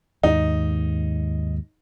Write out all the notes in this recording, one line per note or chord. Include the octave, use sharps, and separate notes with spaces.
D#2 G#2 D#4